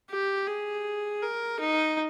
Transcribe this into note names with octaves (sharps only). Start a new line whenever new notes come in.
G4
G#4
A#4
D#4